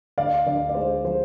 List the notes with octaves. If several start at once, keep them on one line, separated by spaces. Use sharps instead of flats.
D2 D5 F5
D2 D5
D5
G#3 C5
F3 C5